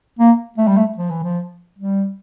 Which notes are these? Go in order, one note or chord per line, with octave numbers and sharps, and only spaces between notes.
A#3
A3
G3
A3
F3
E3
F3
G3